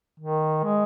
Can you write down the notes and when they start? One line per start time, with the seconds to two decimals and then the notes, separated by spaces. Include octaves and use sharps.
0.20 D#3
0.64 G#3